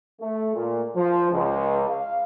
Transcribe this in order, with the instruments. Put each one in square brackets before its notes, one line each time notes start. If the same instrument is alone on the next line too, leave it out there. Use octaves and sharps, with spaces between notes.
[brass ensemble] A3
A#2
F3
C#2
F5